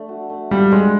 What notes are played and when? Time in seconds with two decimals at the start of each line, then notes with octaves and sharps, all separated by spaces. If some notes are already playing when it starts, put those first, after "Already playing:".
Already playing: A3 D4
0.09 F#4
0.29 A3
0.51 F3 G3
0.71 G#3 D4